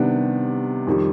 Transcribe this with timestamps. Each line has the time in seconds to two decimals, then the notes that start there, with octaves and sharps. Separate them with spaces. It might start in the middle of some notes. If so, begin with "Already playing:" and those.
Already playing: C3 D#3 G3 B3 D4
0.87 F2 D#3 G3